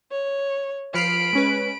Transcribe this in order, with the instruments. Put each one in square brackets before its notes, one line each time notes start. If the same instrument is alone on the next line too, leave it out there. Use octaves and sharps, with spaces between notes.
[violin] C#5
[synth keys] F3 F6 C7 [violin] B5 D7
[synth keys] G#3 C#4 B4